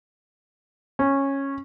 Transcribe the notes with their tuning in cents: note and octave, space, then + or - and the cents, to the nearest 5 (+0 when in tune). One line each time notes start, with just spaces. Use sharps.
C#4 -15